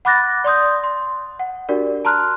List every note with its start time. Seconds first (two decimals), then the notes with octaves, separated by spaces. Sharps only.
0.05 F#5 B5 D6 F#6 A6 A#6
0.44 D5 C6 D#6 G6
0.84 C6
1.39 F#5
1.69 D4 F#4 G4 A#4 D5
2.05 A5 A#5 C6 F6 F#6